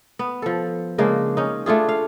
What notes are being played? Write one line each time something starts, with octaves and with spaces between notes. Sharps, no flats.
B3
F3 A4
C#3 G#3 A#3 D4
C#4 D#4
A3 D4 F4 G#4
F5